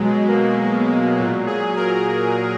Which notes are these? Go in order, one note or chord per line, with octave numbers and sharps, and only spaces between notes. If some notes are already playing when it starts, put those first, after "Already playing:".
Already playing: B2 F#3 G#3
A#3
A#2 F#3
G#4
A#4